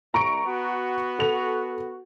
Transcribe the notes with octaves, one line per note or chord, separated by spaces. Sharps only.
C2 A#5 C#6 D7
B3 F#4
A4 F7